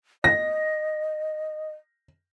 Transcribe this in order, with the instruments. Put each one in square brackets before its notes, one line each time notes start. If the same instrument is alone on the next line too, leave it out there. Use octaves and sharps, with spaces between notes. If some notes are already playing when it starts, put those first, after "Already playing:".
[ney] D#5 [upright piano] A#6